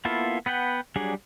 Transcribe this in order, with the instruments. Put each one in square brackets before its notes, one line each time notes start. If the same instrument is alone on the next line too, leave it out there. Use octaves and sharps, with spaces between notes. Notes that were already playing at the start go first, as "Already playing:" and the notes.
[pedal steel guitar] A#3 B3 E4 F4 A4
B3 B4 F#5 G5
F#3 G3 D4 G#4